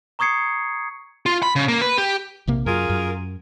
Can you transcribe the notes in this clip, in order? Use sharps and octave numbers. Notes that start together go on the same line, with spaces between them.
A#5 C#6 D#6 G#6 C7 C#7
F4
B5
C#3
A#3
B4
G4
A#1 C3 A#3
F#2 F4 G#4 A#4
F#2